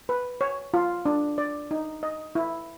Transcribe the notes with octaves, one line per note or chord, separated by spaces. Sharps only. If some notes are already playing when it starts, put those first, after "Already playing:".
B4
C#5
F4
D4
D5
D#4
D#5
E4